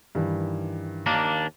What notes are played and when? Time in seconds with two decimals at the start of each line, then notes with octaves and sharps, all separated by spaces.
0.15 G2 D#3 E3
1.06 D#2 A#3 D4